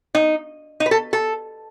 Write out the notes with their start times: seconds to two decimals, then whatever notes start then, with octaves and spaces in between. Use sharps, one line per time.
0.15 D#4
0.80 D#4
0.86 B4
0.91 A4
1.13 A4